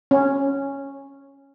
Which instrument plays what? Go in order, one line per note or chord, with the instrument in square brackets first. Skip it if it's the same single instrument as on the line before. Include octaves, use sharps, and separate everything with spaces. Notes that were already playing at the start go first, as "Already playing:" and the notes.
[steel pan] C#4